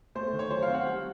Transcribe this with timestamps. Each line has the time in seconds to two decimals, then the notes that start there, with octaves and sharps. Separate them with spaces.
0.15 A3 C5
0.33 D#3
0.39 C#5
0.51 F#3 C5
0.63 F5
0.68 C4
0.74 F#5
0.87 G3